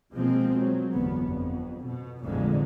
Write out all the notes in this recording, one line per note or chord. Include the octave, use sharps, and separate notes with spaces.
B2 F3 G#3 A#3 C4
F#3
G1 E2 B3
F2
B2
A1 F2 A#2 D3 G#3